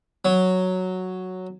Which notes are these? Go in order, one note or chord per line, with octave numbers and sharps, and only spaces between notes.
F#3